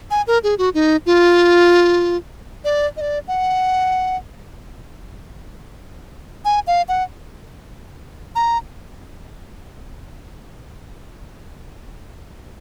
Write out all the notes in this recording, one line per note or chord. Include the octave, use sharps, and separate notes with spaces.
G#5
A#4
G#4
F#4
D#4
F4
D5
D#5
D5
F#5
G#5
F5
F#5
A#5